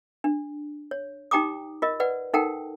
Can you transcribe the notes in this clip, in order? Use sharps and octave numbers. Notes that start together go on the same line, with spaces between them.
D4
C#5
D#4 G4 G5 A#5 D6 D#6
F4 A#4 D#5
B4 D5 F#5
D#4 A4 A#4 F#5 G5 A5